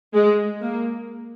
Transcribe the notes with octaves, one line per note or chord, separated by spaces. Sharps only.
G#3
A#3